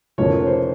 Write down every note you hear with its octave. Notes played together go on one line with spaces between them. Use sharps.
F1 F2 C#3 F3 A#4 C#5
C#5
C5